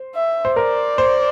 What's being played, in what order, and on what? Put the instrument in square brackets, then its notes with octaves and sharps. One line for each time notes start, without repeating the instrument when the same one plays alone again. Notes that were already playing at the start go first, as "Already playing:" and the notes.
Already playing: [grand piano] C5
[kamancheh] E5
[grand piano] C5
[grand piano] A#4 [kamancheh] D5
[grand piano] C5